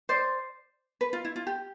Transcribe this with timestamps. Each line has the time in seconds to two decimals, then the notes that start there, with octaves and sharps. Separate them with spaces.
0.09 C5 D5
1.01 B4
1.13 F4
1.25 E4
1.36 F4
1.47 G4